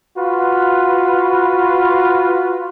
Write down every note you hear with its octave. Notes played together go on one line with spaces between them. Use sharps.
F4 F#4 B4